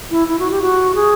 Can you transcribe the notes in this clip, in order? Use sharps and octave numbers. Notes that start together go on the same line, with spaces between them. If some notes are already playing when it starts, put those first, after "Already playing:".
E4
E4
F#4
G4
F#4
G#4